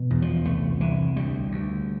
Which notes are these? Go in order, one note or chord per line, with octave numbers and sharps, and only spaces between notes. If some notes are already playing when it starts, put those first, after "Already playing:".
Already playing: B2
E2
F3
C2 A3
C2 E3
D2 G3
D2